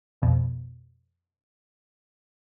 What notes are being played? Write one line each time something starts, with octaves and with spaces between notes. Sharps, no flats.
B1 F2 B2